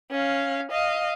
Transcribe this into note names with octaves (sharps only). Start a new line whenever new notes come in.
C#4 F5
D#5 F5